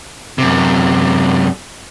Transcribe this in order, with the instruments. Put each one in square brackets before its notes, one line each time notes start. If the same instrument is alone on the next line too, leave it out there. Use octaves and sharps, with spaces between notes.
[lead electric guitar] F#2 C3